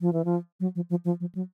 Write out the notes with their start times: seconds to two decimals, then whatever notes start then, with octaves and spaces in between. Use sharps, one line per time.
0.01 F3
0.13 E3
0.25 F3
0.60 F#3
0.75 F3
0.90 F3
1.05 F3
1.20 F3
1.35 F#3